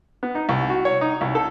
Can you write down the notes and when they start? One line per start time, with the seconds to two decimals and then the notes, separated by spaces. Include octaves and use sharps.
0.23 B3
0.35 D#4
0.49 C2
0.69 F#4
0.85 C#5
1.01 D#4
1.21 C2
1.35 A4